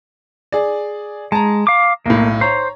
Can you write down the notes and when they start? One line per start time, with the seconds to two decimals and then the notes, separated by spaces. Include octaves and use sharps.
0.52 G#4 D5
1.32 G#3 A5 A#5
1.67 F5 D6
2.06 B1 A2 A#3
2.41 C5 C#5 A#5